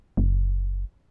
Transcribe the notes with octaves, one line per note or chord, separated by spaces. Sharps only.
F#1